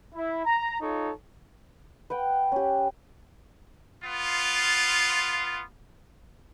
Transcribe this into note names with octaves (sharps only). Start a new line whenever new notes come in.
E4
A#5
D#4 F4 A4 C#5
B4 F#5 G5
C#4 G4
B3 F4